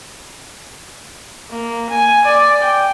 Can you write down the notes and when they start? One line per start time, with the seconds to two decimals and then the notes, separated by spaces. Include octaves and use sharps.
1.50 A#3
1.90 G#5
2.25 D5
2.62 G5